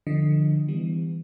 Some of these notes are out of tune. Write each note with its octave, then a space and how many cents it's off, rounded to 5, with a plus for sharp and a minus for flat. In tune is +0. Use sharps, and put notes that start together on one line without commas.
D3 +25 F3 +0 D#5 +0
E3 +0 G3 +20 B3 +35